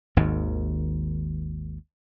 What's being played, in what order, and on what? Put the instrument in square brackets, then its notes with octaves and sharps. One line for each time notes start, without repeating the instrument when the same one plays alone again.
[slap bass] G#1 D#2 G#2